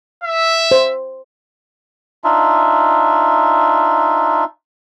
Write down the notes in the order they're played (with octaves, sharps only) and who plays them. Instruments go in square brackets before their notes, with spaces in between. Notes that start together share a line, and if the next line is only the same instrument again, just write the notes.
[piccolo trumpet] E5
[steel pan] C5
[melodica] D4 D#4 F4 E5